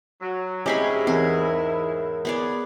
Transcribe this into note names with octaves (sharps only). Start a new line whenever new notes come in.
F#3
G#2 C#4 E4 G4 G#4 D#5 G#5 B5
E2 G#4 A#4 C#5
B3 G#4 D5